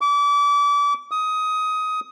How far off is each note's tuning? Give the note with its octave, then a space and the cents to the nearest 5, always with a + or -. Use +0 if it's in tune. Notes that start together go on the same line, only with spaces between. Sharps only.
D6 -30
D#6 +15